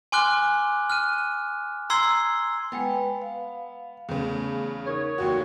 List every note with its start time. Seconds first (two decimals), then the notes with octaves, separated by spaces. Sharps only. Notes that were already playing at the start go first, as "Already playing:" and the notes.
0.12 G#5 C6 D6 F6 F#6 G7
0.90 F6 F#6 D#7
1.90 A#5 C6 E6 G#6 C7 G7
2.72 G#3 B3 B4 G5
3.22 F5
4.09 E2 C#3 A3 B3
4.87 D#4 A#4 C#5
5.18 F1 D#2 F#4